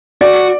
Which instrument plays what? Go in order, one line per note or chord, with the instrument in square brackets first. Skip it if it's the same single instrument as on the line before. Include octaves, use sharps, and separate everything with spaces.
[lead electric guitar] F#4 [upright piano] D5